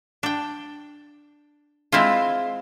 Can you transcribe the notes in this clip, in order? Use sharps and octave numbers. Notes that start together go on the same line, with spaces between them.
D4 G5
G#3 C4 E4 F4